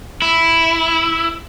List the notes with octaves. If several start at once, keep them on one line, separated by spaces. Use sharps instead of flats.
E4